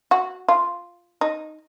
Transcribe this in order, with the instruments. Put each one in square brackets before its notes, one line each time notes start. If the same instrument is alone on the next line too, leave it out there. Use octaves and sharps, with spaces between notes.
[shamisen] F#4
F4
D#4